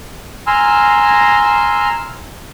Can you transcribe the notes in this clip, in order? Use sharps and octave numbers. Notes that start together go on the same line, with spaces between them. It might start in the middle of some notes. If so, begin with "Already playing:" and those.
G#5 A#5 C6 E6 F6